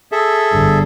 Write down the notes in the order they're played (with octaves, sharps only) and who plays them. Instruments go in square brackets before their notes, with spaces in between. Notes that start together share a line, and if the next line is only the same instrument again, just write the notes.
[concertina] G#4 A4 E5
[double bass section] G1